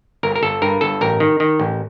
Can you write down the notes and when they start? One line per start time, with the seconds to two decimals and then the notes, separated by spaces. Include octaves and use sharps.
0.23 G1 A#4
0.36 A#4
0.43 G1 A4
0.62 G2 A#4
0.81 G1 A4
1.01 A1 A#4
1.20 D#3
1.40 D#3
1.60 A1